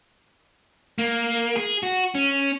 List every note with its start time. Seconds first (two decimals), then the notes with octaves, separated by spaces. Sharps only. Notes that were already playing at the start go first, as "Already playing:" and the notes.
0.99 A#3
1.56 G#4
1.83 F#4
2.15 C#4